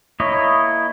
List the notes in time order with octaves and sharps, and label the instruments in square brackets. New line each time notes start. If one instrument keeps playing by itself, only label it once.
[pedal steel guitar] A#3 E4 C#5 D#5